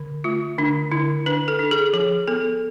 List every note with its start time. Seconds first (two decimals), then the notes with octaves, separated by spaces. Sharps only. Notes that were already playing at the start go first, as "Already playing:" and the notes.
Already playing: D3
0.24 A3 F4
0.58 D3 D4
0.91 D3 E4
1.26 D4 B4
1.48 A4
1.59 D4
1.71 G#4
1.93 F3 G#4
2.28 B3 A4